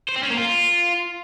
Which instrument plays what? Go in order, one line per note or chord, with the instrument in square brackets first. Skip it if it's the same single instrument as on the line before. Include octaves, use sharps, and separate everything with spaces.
[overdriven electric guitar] C5
C4
C#4
A#3
F4